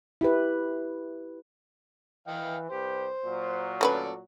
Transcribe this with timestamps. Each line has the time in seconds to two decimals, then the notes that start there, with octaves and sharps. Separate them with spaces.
0.21 E4 G4 B4
2.27 E3 D#5 F5 G5
2.70 C2 G4 B4 C5
3.24 A#2 F#3 F#4
3.81 A3 C#4 A4 B4 D5